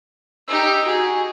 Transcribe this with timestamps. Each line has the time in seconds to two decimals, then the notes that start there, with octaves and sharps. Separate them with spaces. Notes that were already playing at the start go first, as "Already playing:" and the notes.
0.48 D#4 G4 E6
0.86 F#4 G#4